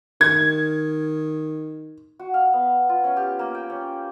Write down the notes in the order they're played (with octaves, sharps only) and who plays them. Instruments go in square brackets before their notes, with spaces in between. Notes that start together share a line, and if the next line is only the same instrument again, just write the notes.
[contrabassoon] D#3 [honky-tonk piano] G#6
[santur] F#4
F5
B3
F4
C#4
G4
A#3
G5
C#4